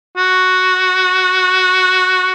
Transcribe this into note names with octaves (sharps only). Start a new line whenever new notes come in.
F#4